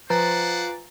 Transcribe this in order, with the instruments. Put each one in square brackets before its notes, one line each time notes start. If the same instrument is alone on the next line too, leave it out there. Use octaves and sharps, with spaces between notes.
[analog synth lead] F3 [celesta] B4 [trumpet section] C5 D5 F#5 [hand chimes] G#5 A#5 A6